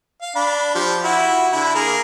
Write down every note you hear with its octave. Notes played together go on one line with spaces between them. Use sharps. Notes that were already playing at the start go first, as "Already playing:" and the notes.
F5
D4 B5
F3 G4
E4 F#4
D3 E4
A#3 G#4 A#4